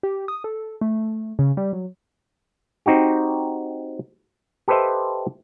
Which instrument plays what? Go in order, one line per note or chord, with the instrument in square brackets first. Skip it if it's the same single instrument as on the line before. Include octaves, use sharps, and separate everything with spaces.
[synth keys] G4
D#6
A4
A3
C#3
G3
F#3
[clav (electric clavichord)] C4 D#4 F#4 G4
G4 A4 B4 C5 D#5 E5